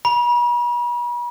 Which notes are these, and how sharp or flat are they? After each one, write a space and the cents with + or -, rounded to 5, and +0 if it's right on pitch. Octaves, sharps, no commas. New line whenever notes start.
B5 -45